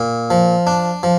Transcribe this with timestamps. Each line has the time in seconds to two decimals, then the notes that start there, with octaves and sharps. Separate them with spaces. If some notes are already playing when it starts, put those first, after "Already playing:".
Already playing: A#2
0.30 F3
0.67 D4
1.03 F3